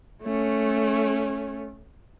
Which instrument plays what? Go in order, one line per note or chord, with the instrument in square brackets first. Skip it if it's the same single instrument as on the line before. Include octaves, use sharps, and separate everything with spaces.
[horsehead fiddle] A3 C#4